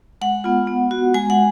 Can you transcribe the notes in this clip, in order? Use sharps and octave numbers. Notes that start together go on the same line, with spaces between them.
G#3 F#5
B3 F4
B3
F#4
G#3 G#5
F#5